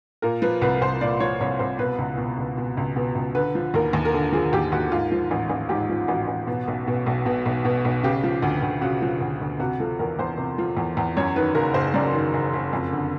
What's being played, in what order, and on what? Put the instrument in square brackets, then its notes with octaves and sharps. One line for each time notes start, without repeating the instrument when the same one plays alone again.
[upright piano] A#2 A#4
F3 B4
C2 B4
C2 C5
A#2 D5
F3 C#5
C2 C#5
C2 C5
B2 B4
C#2
B2
C#2
B2
C#2
B2
C#2
D3 B4
F3
D#2 A#4
D#2
A#4
D3 A4
F3 G#4
D#2 G4
D#2 F#4
G#2 F4
F3
A1
A1
G#2 G4
F3
A1 F#4
A1
B2
B1
B2
B1
B2
B1
B2
B1
C#3 G4
F3
D2
D2
C#3 F#4
F3
D2
D2
C3 F#4
F3 A4
E2 A#4
E2 C5
C3
F3
E2
E2
F#2 C#5
D#3 B4
F#1 A#4
F#1 C5
F#2 D5
D#3
F#1
F#1
F2
D3